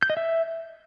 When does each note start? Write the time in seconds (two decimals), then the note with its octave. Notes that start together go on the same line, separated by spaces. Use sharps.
0.03 G6
0.10 D#5
0.17 E5